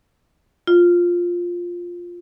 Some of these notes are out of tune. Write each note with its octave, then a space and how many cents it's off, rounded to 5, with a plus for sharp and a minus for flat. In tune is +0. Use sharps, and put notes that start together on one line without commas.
F4 +5